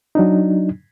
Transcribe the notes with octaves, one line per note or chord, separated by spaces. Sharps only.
F#3 D4 D#4